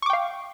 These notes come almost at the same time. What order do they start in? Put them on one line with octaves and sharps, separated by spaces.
C#6 D6 G5 F5